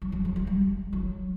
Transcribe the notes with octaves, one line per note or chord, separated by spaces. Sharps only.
F#3
F#3
F#3
F#3
G3
F#3